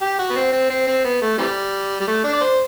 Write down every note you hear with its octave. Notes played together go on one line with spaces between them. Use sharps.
G4
F#4
B3
C4
C4
C4
C4
B3
A3
C3 E3 G3
G3
A3
D4
D5
C5